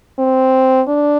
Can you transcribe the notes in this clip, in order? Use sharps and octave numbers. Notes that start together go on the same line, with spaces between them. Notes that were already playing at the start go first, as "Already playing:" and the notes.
C4
D4